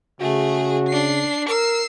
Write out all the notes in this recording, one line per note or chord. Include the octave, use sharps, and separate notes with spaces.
C#3 A3 F#4 G#4
D4 C7
A#4 E6 C7